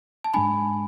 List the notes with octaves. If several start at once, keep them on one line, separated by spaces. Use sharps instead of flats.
A5
G#2 G#3 D4 G#5 B5